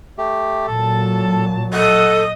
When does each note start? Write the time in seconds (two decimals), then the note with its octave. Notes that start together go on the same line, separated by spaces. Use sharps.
0.18 A3 G4
0.67 A#2 F#3 A4 A5
1.74 A4 D#5 F#5 D#6